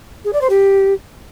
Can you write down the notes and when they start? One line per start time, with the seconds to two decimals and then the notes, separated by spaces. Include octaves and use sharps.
0.24 G#4
0.33 D5
0.41 C5
0.49 G4